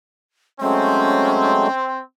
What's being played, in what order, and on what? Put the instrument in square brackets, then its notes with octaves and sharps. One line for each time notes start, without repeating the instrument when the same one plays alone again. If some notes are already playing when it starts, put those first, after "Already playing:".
[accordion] F#3 G#3 A3 [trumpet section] C4 [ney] C#4